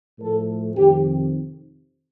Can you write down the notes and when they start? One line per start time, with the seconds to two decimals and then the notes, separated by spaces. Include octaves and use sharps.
0.19 A2 F3 A3 A4
0.75 F2 C3 D#3 G4